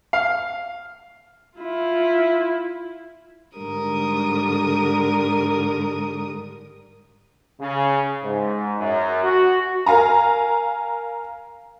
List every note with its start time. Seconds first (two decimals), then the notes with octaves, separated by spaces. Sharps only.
0.13 F5
1.58 E4 F4
3.58 G#2 D3 G3 A#4 D#6
7.60 C#3
8.24 G#2
8.79 F#2
9.23 F#4
9.86 A#4 F5 G#5 A#5